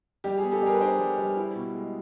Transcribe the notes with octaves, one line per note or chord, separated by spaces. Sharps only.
G3 G4
G#4
B3
G4 A4
G3 G#4 A#4
B4
D4 A#4 C5
G3
G3
E4
B2
G#3